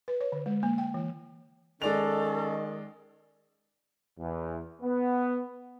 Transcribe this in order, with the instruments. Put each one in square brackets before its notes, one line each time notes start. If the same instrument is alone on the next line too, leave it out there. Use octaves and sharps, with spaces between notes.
[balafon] B4
C#5
D3
G#3
A#3
G5
E3
[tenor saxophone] D#3 [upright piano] G#3 D5 F7 [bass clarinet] C#4 [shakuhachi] A4
[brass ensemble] E2
B3